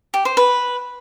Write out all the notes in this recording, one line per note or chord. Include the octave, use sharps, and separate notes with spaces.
G4
C5
B4